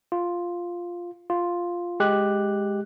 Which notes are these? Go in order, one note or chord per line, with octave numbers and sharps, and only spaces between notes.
F4
F4
G#3 G4 F#6